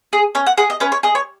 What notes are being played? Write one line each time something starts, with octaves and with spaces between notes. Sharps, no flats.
G#4
C#4 C#5
F#5
G#4 F#5
D#5
C#4 B4
C#5
G#4 D#5
C#5